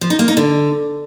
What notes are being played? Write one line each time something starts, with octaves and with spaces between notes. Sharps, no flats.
F3
D#4
A#3
D#4
D3